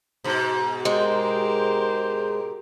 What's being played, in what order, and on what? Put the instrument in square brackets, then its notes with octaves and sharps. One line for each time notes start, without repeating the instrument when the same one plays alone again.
[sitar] G#2 B2
[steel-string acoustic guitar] G#3 [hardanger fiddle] G4 A#4 [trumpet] C5